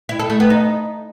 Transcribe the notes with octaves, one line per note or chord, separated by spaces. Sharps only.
E4
A4
A3
B3
D#4